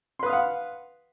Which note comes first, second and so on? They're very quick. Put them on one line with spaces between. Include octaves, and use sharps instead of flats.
C6 B4 D#6 F5 F#5